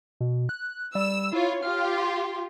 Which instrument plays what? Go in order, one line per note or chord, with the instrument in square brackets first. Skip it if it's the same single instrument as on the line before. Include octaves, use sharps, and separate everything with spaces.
[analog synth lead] B2
F#6
[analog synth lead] G3 [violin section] E6
[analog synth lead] E4 [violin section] F4 C#5
[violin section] F4 G4 [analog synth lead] F6
[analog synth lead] C6